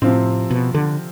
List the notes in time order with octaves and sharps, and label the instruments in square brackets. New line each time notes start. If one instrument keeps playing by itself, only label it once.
[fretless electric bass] A2 [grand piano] C3 F3 C4
[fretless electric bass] B2
D3